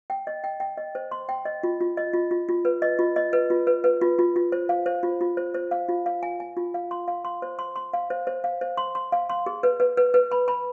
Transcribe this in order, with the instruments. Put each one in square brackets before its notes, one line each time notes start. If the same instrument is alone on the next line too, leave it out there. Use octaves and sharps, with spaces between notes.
[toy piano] G5
D#5
G5
G5
D#5
C5
C6
G5
D#5
F4
F4
D#5
F4
F4
F4
B4
D#5
F4
D#5
B4
F4
B4
B4
F4
F4
F4
C5
F5
C5
F4
F4
C5
C5
F5
F4
F5
G#5
G#5
F4
F5
C6
F5
C6
C5
C6
C6
F5
C5
C5
F5
C5
C6
C6
F5
C6
G#4
B4
B4
B4
B4
B5
B5